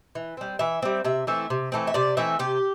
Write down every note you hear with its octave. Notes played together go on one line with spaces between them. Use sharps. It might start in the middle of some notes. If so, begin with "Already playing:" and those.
E3
G3 C4
E3 E5
G3 C4
C3 E5
E3 A3 C4 E5
C3
E3 A3 C4
E5
C3 D5
E3 A3 C4 E5
C3 G4